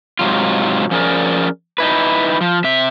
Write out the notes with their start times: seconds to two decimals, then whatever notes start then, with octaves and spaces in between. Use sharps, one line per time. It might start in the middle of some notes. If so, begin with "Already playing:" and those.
0.19 G#2 C3 F#3 F4
0.91 F3 C#4 G#4 A#4 D5
1.78 D#4 E4 B4
2.41 F3
2.64 C3 E5